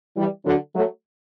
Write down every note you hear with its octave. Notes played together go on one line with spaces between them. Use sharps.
E3 G3
D3 F#3
F#3 A3